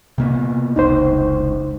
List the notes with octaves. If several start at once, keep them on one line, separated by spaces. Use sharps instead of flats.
C3 A#3 B3
F1 C#2 D#4 C5